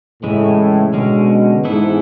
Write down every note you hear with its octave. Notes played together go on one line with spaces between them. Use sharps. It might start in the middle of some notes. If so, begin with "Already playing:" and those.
A2 C#3 E3 G#3
B2 D3 G#3 C#4
G#2 E3 B3 E4 A4